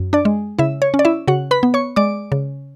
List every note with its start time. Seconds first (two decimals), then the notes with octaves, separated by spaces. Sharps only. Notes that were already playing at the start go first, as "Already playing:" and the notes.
Already playing: F#2
0.13 D4 D5
0.25 G#3
0.59 C#3 E4 E5
0.82 C#5
0.94 C#4
0.99 D5
1.05 E4 E5
1.28 C#3 F#4 F#5
1.51 B4 B5
1.63 B3
1.74 C#5 C#6
1.96 G#3 D5 D6
2.32 C#3